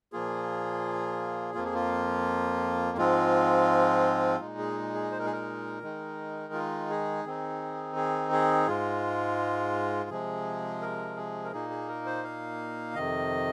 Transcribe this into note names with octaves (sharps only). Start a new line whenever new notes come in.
A#2 F3 A#3 F4 G#4
F2 F3 A#3 F4
G#4
F4
G#2 F3 G#3 C4 F4
A#2 G#3 D#4
G#4
G#4
C5
A#4
G#4
A#4
D#3 G#3 D#4
F4
G#4
D#3 C4 D#4
G#4
G#4
G#2 G#3 F4
C3 F3 G#3 G#4
A#4
G#4
A#4
A#2 A#3 D#4 G#4
G#4
A#4
C5
F5
F2 C3 D#3 D#5